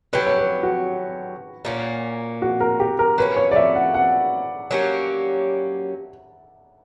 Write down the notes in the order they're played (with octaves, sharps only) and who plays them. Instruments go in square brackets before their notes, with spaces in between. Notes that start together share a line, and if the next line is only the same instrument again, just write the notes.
[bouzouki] D3 F#3 C#4 G4 [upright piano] B4
[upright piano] C#5
B4
F#4
[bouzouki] A#2 A#3 C#4
[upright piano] F#4
A#4
G4
A#4
[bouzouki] F#3 A#3 C#4 [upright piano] B4
[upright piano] C#5
D5
E5
F#5
F#5
[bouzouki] F#3 A#3 C#4 G4